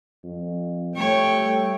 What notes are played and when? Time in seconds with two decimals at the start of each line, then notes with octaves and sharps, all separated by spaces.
0.23 F2
0.97 G3 A3 C#5 G5